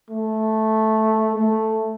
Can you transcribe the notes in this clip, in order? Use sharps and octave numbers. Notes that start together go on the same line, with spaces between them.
A3
A3